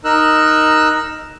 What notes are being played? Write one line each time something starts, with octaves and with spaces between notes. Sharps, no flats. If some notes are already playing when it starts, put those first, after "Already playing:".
D#4 A#4 E6 F#6